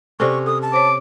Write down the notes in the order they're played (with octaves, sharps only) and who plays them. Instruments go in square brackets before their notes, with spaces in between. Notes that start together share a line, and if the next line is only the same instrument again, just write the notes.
[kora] C3 C#4 [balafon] A4 C5 D5 [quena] C#6
[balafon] A4 [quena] D#6
[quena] A5
[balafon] C5 C#5 [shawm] D6